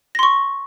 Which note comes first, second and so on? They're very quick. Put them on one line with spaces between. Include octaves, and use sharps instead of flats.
A#6 C6 C#6